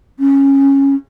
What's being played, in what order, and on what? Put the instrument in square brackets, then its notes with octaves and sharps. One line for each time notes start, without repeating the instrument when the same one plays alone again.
[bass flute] C#4